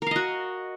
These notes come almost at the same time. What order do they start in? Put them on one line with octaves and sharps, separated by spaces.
A#4 F5 D#5 F#4